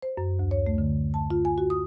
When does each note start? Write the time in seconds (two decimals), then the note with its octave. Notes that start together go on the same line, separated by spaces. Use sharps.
0.02 C5
0.17 F#2
0.39 D2
0.51 C#5
0.67 A3
0.78 D3
1.14 A5
1.30 F4
1.45 G#5
1.58 F#4
1.70 D#6